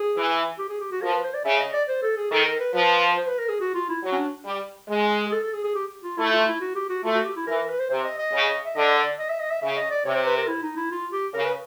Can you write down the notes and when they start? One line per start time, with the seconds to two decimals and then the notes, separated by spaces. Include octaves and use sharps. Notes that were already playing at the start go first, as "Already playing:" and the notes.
Already playing: G#4
0.16 E3
0.58 G4
0.69 G#4
0.80 G4
0.91 F#4
1.02 F3 A#4
1.12 B4
1.24 C5
1.34 D5
1.45 C#3 E5
1.59 D#5
1.73 D5
1.88 C5
2.02 A4
2.16 G#4
2.31 D#3 A4
2.45 A#4
2.59 B4
2.74 F3 B4
3.16 C5
3.27 B4
3.38 A#4
3.49 G#4
3.60 F#4
3.74 F4
3.89 E4
4.03 F#3
4.12 C#4
4.17 D4
4.45 G3
4.88 G#3
5.26 G#4
5.32 A4
5.43 A4
5.53 G#4
5.64 G#4
5.75 G4
6.04 F4
6.17 A3 E4
6.32 F4
6.46 E4
6.60 F#4
6.75 G4
6.89 F#4
7.04 A3 F4
7.14 F#4
7.25 G4
7.36 E4
7.47 E3 A#4
7.58 A#4
7.68 B4
7.79 C5
7.90 C3 C5
8.04 D#5
8.18 D#5
8.32 C#3
8.65 E5
8.76 D3 D#5
8.97 D5
9.19 D#5
9.29 E5
9.40 D#5
9.50 E5
9.62 C#3 E5
9.76 D#5
9.90 D5
10.05 C3 C#5
10.15 C5
10.26 B4
10.37 A#4
10.47 E4
10.62 D#4
10.76 E4
10.91 F4
11.12 G4
11.34 C#3 A#4
11.44 B4